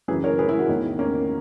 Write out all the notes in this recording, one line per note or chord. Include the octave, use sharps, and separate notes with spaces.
F#2 C#3 E3 G#4 B4
A#4 C#5
G#4 B4
E4 G#4
F#4 A#4
E2 D#3
A#3 C#4